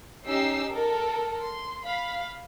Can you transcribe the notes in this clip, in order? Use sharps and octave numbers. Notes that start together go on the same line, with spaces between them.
C#4 D#4 G4 E6 C7
A4 A#4
C6
F5 B5